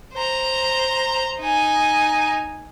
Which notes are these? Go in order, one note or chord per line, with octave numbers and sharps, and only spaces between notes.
C5 A#5
D#4 G#5